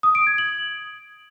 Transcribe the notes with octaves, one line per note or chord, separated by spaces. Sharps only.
D#6
D7
G#6
F#7